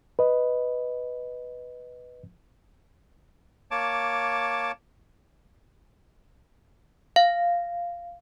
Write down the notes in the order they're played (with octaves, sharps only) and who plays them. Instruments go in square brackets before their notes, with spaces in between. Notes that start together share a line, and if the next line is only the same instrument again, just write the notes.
[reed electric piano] B4 D#5
[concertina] A#3 C#5 A5 D6
[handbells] F5